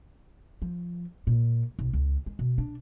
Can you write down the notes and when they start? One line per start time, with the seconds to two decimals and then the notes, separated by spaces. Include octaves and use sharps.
0.62 F3
1.27 A#2
1.79 B1
1.93 C#2
2.26 G#3
2.39 B2
2.58 D4